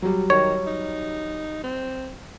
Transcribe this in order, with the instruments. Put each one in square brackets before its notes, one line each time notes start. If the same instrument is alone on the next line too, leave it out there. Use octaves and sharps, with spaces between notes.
[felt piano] F#3 G3
[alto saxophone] D#3 [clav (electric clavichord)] C#5
[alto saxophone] D#4
C4